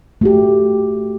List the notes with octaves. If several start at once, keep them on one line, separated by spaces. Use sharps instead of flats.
A3 F#4 G4